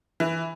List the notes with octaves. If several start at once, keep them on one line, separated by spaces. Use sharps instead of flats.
E3